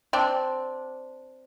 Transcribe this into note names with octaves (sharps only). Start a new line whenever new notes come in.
C4 D4